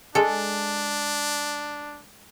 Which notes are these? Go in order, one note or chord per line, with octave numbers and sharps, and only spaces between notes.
G#3 D4 A4